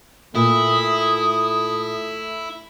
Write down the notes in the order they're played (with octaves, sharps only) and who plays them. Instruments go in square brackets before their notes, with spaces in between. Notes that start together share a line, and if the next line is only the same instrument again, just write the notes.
[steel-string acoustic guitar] A#2 [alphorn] A3 [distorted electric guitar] E4 [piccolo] D#6